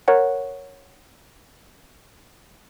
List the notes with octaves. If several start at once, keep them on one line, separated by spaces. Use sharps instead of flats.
A#4 C#5 F#5